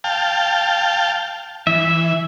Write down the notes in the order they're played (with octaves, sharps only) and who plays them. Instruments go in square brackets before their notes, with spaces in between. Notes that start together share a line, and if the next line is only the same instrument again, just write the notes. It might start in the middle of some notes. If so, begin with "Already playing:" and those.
[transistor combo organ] F5 G5 A5
[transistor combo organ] E3 [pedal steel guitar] E5